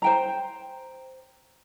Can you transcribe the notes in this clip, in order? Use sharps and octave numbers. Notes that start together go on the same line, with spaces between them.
C5 G5 A#5